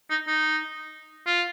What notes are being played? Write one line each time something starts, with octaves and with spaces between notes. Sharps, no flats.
D#4
D#4
F4